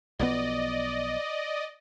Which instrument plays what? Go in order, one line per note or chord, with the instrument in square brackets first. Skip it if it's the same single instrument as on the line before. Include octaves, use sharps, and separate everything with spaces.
[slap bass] B1 F3 B3 [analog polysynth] D5 D#5